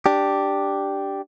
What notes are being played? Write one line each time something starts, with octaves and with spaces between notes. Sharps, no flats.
D4 G4